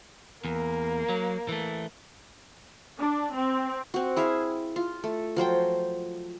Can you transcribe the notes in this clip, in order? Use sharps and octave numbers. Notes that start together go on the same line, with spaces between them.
E2 A#3
F#3
E3 A3
D4
C4
C4 F#4
E4 G#4 E5 F5
F4
A3
F3 F#3 C5 G5